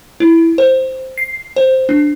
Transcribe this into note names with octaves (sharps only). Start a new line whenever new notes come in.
E4
C5
C7
C5
D4